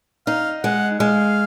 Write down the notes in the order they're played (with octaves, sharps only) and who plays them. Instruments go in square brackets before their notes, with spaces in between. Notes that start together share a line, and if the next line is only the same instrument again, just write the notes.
[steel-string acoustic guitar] D#4 [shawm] F5
[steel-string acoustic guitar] G#3 [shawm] F#5
[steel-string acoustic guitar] G#3 [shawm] F5